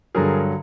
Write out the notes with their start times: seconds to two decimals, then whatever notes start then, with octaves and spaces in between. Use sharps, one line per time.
0.15 G2 D3 F#3 G#4 A#4